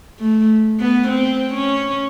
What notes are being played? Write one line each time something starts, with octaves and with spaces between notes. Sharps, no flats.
A3
B3
C4
C#4